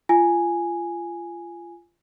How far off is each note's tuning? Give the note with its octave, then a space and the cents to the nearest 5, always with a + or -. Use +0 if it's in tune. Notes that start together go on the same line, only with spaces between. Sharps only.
F4 -25 G#5 +0